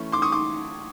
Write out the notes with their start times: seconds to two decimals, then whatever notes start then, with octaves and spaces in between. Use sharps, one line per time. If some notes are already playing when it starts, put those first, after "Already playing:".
Already playing: E3 A3 C#4
0.12 C6 D6
0.22 C#6 D#6
0.32 C6 D6